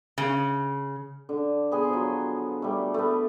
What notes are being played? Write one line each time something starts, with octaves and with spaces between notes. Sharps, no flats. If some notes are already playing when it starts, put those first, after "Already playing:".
C#3
D3
B3 G#4 C6
F3 F#3
G3 A3
A3 B3